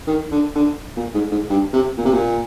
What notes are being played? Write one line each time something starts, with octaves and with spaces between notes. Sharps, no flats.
D#3
D3
D3
A#2
G#2
G#2
G2
C3
A#2
C3
A#2